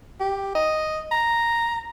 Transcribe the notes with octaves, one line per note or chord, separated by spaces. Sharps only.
G4
D#5
A#5